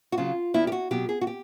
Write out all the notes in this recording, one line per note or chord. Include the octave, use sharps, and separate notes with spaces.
F#4
C#3 F#3 F4
E2 E4
G4
F#4
B2 F#3 G4
G#4
F#4
G4